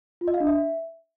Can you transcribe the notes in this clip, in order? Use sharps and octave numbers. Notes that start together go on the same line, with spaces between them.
F4
D#5
F5
D4
E5